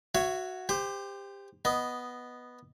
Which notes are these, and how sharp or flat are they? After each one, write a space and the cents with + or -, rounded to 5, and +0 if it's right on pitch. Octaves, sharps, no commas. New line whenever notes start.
F#4 +0 C#5 +0 E5 +30
G4 +20 C5 -15
B3 +0 D#5 +0